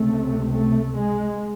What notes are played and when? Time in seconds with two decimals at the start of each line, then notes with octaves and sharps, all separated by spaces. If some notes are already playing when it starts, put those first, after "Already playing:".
Already playing: C#2 C3 A3
0.52 A3
0.98 G#3